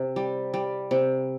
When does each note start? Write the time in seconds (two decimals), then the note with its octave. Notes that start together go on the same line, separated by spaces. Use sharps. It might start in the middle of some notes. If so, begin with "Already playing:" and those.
Already playing: C3
0.16 G3
0.54 G3
0.91 C3